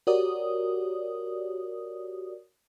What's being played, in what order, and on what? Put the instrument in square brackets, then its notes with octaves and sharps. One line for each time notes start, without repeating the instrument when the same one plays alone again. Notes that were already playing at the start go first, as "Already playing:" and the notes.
[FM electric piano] F#4 G4 A#4 C#5 D5 D#6